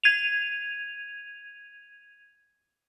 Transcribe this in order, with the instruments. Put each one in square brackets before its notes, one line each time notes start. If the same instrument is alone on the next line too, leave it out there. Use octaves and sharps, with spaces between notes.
[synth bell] G#6 D#7 F7